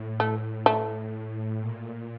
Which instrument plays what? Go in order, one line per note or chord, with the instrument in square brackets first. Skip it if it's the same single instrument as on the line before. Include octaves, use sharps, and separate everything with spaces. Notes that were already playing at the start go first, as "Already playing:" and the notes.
Already playing: [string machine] A2
[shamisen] A3
A3
[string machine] A#2